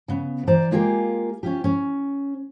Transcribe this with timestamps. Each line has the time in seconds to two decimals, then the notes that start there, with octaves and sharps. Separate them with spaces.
0.08 C#3 B3
0.47 E3 C5 D5 A#5
0.71 G#3 A#3 F4 G4 G#4 A#4
1.43 C#4 F4 G4
1.64 C#4